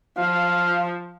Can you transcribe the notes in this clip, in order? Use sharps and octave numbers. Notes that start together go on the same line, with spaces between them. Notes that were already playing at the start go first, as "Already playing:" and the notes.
F3 F5